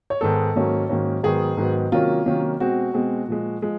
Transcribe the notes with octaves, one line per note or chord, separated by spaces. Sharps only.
C#5
G#2 D#3 G#3 B3 A4
G#2 D#3 F#3 A#3 C#4
G#2 D#3 F#3 A#3 C#4
G#2 D#3 F#3 B3 G#4
G#2 D#3 F#3 B3
C3 D#3 F#3 A#3 C#4 F4
C3 D#3 F#3 A#3 C#4
B2 G#3 C4 F#4
B2 G#3 C4
A#2 F3 G#3
F3 G#3